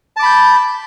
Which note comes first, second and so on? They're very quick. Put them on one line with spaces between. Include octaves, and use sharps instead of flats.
A5 D6 B5 G6